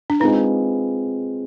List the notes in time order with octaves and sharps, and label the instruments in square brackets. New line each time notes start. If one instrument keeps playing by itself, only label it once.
[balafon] D4
[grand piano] G#3 C4 F4 B4 [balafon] D#4